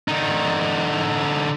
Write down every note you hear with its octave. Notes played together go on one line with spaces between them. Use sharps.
D3 D#4